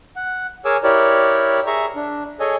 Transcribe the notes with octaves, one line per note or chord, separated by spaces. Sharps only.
F#5
G#4 A#4 C#5 G#5 D6 E6
E4 G4 A#4 C#5 D5
G#4 E5 A#5 C#6
D4
G#4 A4 C#5 D#5 G#5